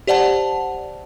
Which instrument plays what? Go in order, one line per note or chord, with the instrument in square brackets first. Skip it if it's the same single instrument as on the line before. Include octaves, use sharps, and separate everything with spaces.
[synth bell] G4 C5 D5 F#5 A5